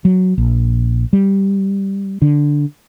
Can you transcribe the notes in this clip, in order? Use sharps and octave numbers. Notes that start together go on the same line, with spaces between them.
F#3
A#1
G3
D3